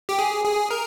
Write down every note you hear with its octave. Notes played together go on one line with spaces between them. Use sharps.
G4
G#4
G#4
A#4